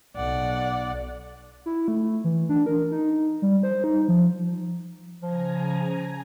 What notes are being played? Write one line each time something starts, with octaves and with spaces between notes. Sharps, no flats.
B1 D5 F#5
E4
A3
E3
D4
A#4
D#4
G3
C5
D#4
F3
C#3 F3 G#5 A#5